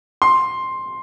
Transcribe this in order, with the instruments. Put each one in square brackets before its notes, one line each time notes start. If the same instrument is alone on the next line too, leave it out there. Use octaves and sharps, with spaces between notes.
[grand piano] C6